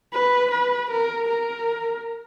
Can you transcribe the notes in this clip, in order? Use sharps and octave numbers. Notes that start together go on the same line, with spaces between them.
B4
B4
A#4
A#4